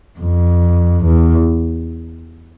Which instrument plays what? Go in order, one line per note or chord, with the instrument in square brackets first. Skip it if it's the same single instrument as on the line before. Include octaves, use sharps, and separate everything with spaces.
[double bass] F2
E2